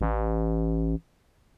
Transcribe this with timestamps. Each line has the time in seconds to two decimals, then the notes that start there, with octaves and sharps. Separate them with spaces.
0.01 A1